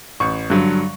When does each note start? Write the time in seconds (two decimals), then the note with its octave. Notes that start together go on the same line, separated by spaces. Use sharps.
0.20 A1 C#6
0.50 G2 D3 F#3